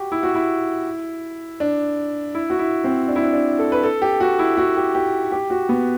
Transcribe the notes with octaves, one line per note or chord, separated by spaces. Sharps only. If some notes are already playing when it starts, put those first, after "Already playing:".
Already playing: F#4 G4
E4
F#4
E4
D4
E4
F#4
E4
C4
D4
E4
D4
D4
A4
B4
A4
G4
F#4
E4
F#4
G4
G4
G4
F#4
B3